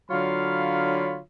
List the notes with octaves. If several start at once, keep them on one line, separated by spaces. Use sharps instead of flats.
D3 F#3 F4 C#5 F5 B5